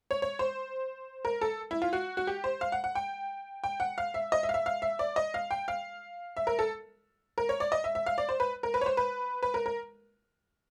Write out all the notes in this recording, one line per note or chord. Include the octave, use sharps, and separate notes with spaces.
C#5
C#5
C5
A#4
A4
E4
F4
F#4
F#4
G4
C5
F5
F#5
F#5
G5
G5
F#5
F5
E5
D#5
E5
F5
E5
F5
E5
D5
D#5
F5
G5
F5
E5
A#4
A4
A#4
C#5
D5
D#5
E5
E5
F5
D5
C5
B4
A#4
B4
C#5
C5
B4
B4
A#4
A#4